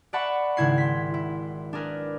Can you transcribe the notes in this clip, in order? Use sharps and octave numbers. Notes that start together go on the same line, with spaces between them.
D5 E5 F#5 A5 B5 C#6
G#1 C#3 E4 G#6 C7
C6 B6
E4
D4 G#4 A#4 B4